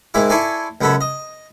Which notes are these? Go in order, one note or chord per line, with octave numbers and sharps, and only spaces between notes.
G#2 D#3 G#3 E4 D6
E4 A4 C#5 D5 G#5 C6
C#2 F#2 B3 A4 B5
D#5